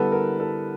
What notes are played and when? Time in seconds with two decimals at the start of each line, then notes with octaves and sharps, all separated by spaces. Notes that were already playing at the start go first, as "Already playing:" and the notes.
Already playing: D3 G3 B3 E4 A4 B4
0.12 A#4
0.40 A4